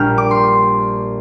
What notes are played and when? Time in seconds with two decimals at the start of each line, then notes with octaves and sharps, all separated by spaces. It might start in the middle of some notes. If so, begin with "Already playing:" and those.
Already playing: A#1 A#2 G3 F6 G6
0.18 D6
0.31 C6